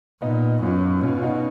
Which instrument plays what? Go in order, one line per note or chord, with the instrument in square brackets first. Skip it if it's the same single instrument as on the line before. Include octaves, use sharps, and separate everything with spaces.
[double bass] A#2 [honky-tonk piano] B3 D#4
[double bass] F#2 [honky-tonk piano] C#4 F4
[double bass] B2 [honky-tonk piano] C#4 F4
[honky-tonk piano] F4
D#4 F#4